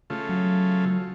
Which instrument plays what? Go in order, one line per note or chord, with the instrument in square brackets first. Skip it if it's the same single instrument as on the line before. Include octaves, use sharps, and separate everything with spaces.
[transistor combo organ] C#3 A3 F4
[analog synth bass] F#3